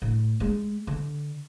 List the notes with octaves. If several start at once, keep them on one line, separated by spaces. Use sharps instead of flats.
A2
G#3
D3